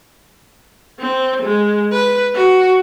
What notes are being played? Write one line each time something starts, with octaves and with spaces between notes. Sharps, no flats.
C4
G#3
B4
F#4